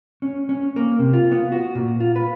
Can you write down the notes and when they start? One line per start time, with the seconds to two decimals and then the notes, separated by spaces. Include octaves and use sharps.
0.22 C#4
0.49 C#4
0.76 A#3
0.99 C3
1.13 F4
1.32 B3
1.52 F#4
1.75 A#2
2.00 F4
2.16 B4